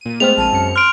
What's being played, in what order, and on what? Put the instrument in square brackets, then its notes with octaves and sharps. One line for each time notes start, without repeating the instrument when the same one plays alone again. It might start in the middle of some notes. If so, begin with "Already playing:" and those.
[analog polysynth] A#2 D#7
[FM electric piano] G#3 C4 F6 [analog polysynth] A3 B3 [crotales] F7
[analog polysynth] A#1 D#7 [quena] A5
[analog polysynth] F#2 C#7
[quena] C6 [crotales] F6 D7 [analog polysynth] F#6